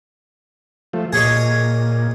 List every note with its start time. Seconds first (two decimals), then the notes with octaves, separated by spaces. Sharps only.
0.93 F3 A3
1.13 A#2 G#4 C#5 D#5